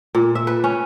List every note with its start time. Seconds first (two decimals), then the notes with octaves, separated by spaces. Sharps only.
0.15 A#2
0.35 E5
0.47 B4
0.64 C#4